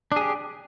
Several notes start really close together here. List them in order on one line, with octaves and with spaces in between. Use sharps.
D4 G#4 G4